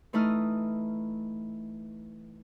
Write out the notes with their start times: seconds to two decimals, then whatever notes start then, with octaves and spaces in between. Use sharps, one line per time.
0.13 E3 A3 D#4 E4 D#6 F6